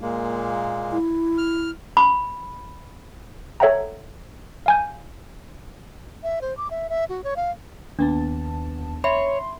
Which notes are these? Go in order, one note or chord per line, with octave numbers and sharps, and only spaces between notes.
A#2 G#3 A#3
E4
F6
B5
A4 C#5 E5 F#5 G5 A#5
F5 G#5 G6
E5
C5
D6
E5
E5
F#4
C#5
F5
D#2 B3 D4 A5
C#5 E5 B5 C6